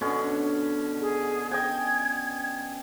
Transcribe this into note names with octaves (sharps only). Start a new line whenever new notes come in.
B2 D3 C#4
G#4
D#5 G5 G#5 G#6